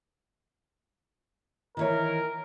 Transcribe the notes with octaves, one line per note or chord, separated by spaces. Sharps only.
D#3 E3 A#4 C#5